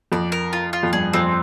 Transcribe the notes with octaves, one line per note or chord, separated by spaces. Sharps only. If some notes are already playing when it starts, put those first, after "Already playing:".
F2 D5
A#4
F4
F4
F2
G2 G#4
F2 C4